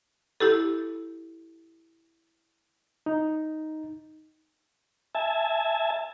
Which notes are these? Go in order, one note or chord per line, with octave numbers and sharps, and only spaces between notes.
E4 G4 A4
D#4
E5 G#5 A5